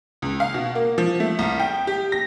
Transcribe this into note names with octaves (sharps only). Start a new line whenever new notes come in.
C#2
F5
B2
A#3
F3
A3
C2
G5
G4
A#6